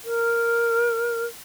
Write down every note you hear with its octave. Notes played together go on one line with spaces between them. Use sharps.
A#4